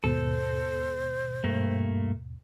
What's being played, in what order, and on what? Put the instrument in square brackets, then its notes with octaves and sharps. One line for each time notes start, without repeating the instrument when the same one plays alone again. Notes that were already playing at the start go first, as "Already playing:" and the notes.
[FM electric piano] D#2 G#2 B2 [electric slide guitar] A4 [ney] C5
[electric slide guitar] G2 A3 A#3